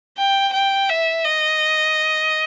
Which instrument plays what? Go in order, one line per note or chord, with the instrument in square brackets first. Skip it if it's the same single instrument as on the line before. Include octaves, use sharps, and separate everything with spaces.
[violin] G5
G5
E5
D#5